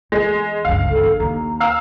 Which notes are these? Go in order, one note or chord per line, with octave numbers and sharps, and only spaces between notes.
E2 G#3
G1 C#2 F5
A4
D3
D#2 A#5
F5 E6 F6